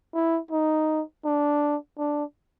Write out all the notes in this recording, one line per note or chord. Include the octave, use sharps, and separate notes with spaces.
E4
D#4
D4
D4